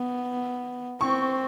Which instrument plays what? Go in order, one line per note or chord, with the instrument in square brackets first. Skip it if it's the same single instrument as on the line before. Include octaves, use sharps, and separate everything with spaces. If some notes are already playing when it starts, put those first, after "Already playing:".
Already playing: [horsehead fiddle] B3
[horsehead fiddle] C4 [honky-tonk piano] C#6